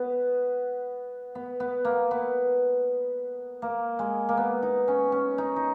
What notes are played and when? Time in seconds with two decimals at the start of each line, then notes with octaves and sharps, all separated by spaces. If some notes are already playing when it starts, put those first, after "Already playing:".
Already playing: B3
1.35 B3
1.60 B3
1.85 A#3
2.11 B3
3.62 A#3
3.99 G#3
4.29 A#3
4.37 B3
4.63 D#4
4.88 C#4
5.12 C#4
5.38 D#4
5.56 D#4